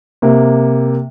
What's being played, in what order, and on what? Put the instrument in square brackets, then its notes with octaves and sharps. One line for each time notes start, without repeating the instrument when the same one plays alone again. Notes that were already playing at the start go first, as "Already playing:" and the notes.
[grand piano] C3 A#3